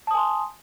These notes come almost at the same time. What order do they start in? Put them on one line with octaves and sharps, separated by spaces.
A5 D#6 G#5 C6